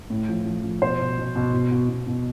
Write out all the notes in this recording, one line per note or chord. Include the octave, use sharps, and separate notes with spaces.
A2
F3
F3
F3
B2 C5
B2
B2
B2
B2
B2
B2
B2